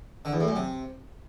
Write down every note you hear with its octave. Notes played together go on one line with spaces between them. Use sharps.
D3
E2
A2
F#2
C3